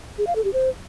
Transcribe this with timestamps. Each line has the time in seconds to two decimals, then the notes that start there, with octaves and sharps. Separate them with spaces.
0.18 G#4
0.27 F5
0.36 A4
0.44 G4
0.53 C5